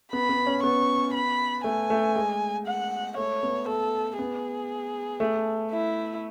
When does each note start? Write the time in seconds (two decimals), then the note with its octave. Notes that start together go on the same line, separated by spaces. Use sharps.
0.13 B3 B5
0.29 B3
0.47 C#4
0.63 B3 C#6
1.14 B5
1.64 A3 G#5
1.90 A3
2.16 G#3
2.67 F#5
3.17 A3 C#5
3.43 B3
3.68 A3 A4
4.19 B3 G#4
5.20 A3
5.71 E4